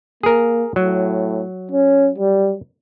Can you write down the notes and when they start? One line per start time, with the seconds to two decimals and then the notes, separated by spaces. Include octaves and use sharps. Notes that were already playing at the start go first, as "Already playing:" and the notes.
0.23 A#3 G#4 A#4
0.76 A2 F#3
1.72 C#4
2.18 G3